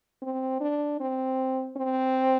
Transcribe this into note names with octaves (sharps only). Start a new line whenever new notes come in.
C4
D4
C4
C4